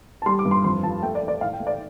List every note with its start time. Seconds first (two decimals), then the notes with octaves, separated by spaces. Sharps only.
0.22 A5
0.26 G3 C6
0.39 D6
0.45 G2
0.51 C6
0.64 F2 C6
0.83 F3 A5
1.03 A3 G5
1.15 D5
1.22 A3
1.28 D5
1.41 A2 F5
1.53 G5
1.60 A3
1.67 D5